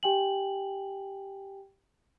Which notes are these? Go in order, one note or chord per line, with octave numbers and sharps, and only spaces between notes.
G4 G5 G#5 F#7